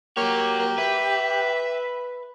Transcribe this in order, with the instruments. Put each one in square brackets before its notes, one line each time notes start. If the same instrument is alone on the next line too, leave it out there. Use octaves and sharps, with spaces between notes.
[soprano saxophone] A#3 [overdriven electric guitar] F#4 C#5 [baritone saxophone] G4
[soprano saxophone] A#3
[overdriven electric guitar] B4 [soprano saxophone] E5